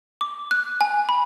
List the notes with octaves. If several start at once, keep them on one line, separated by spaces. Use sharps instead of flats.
D6
F#6
G#5
B5